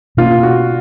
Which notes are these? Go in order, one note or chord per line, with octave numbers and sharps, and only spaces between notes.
B2 A#3 C#4 F4
F#4